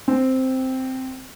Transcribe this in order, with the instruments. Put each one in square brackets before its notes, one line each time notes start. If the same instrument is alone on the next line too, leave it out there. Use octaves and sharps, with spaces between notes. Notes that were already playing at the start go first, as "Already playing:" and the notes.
[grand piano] C4